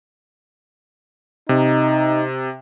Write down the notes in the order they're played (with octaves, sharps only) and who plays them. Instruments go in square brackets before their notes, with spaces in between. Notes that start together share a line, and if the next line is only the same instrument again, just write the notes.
[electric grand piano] C3 [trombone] D#4